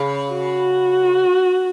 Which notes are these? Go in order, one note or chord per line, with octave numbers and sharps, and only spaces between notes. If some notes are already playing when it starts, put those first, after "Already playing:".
Already playing: C#3
F#4